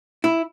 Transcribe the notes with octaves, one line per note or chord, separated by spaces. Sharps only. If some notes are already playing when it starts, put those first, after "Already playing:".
E4